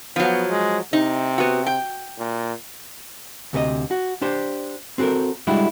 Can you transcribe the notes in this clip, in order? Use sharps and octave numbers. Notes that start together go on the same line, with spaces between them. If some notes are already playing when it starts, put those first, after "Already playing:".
F3 F#3 B3
G#3
C3 D#4
B3 F#4
G5
A#2
D2 C3 A4 D#5
F#4
D4 G4 C5
C4 F#4 G4 A4 A#4
G3 G#3 D4 E4 F#4